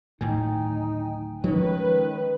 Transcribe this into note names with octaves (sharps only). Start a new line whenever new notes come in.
D1 A2 D#3 D#4 G5 G#5
D#3 F3 G#3 C#4 D#4 B4 C#5